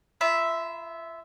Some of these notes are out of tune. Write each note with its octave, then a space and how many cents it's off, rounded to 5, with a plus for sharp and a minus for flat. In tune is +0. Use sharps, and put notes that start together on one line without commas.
F4 -35 E5 +0 B5 -25